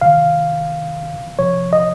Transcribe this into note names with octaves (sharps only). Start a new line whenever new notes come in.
C3 D#3 F5
C3 F3 C#5
D#5